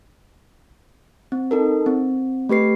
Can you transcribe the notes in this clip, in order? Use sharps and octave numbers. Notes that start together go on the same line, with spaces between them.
C4
D#4 A4 A#4
C4
A3 G4 B4 C7